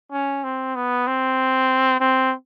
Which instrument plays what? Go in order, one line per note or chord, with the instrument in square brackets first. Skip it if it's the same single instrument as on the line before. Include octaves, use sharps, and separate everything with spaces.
[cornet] C#4
C4
B3
C4
C4